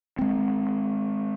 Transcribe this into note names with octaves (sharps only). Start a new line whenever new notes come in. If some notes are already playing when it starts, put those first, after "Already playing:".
G#3 C4